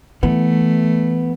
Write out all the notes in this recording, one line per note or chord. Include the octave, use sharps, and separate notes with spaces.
E3 A3 B3